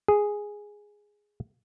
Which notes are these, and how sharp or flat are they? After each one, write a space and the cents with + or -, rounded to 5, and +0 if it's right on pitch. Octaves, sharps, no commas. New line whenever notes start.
G#4 +0